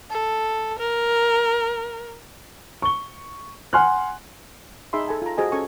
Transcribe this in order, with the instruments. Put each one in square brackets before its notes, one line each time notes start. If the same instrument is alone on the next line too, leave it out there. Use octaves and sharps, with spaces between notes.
[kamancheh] A4
A#4
[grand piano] C#6 G7
F#5 G#5 C6 F6 F#6
[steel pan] D#4 G#4 E5 B5 C6
A4 G#5 A5
F4 A#5
F#4 G#4 C5 D#5 G#5
C#4 A4 G#5 C#6